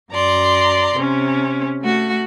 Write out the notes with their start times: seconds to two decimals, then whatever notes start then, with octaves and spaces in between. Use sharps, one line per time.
0.12 F#2 D5 A#5 C6
0.95 C3 C#4
1.81 A3 F#4